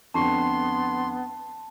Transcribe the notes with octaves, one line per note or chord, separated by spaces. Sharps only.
F2 D3 B3 A5 C6 C#6